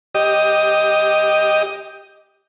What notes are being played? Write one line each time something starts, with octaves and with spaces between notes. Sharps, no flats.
G4 D#5